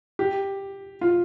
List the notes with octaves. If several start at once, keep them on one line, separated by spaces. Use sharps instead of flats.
G4
F4